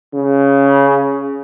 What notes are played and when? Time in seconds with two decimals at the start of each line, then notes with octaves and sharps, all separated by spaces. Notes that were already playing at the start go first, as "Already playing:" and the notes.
0.13 C#3